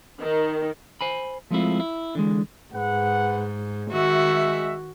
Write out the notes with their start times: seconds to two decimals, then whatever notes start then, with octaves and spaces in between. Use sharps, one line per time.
0.21 D#3
1.01 C5 G#5 B5
1.51 F3 G#3 A3 C4 E4 F4
1.80 E4
2.15 D3 E3 G#3
2.74 G#2 G#4 B4 F#5
3.91 D#3 G#3 F#4 E5